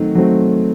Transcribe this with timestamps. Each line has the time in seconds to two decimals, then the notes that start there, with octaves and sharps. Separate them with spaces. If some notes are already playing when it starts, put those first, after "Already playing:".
Already playing: D#3 F#3 A3 C4
0.15 F#3 A3 C4